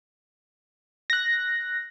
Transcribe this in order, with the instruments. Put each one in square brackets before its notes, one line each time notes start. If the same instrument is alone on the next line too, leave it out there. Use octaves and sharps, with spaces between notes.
[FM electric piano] F#6 A#6